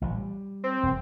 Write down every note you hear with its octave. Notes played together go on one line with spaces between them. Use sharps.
A1 A#2 F3
G3
C4
E1